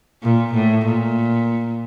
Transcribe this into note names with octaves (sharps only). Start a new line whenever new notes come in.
A#2
A2
A#2